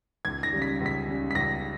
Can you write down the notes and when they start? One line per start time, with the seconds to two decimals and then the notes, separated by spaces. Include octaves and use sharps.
0.25 C#2 G#6
0.43 A#6
0.53 C#3 G3
0.62 B6
0.80 C#2
0.86 B6
1.08 C#3 G3
1.31 B6
1.35 C#2 A#6